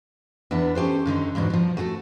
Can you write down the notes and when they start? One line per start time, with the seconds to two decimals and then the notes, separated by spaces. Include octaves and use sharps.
0.51 E2 B3 D4 E5
0.75 C#4 G4 A4 C5
1.06 F#2 D3 D#3 D#4
1.35 E2 G#2 B2 D4
1.50 A#2 F3
1.77 A3 F#4 G#4 A4